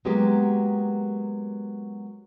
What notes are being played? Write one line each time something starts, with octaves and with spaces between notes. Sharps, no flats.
F#3 G#3 A#3 B3 G4